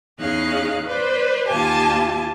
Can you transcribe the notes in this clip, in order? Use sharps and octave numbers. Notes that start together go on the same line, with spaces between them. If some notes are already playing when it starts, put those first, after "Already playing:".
E2 C#4 D#4 G#4 F5 F#6
B4 C5 D5
D#2 F4 G4 G#5 A5